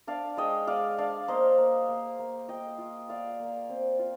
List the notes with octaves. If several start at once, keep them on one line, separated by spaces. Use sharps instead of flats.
D4 D5 F5
G#3 D#5 G5
G#3 D5 F5
D4 D5 F5
A#3 C5 D#5
A#3
A#3
A#3
F4 D#5 G5
F4
F4 D5 F5
A#3
C4
F4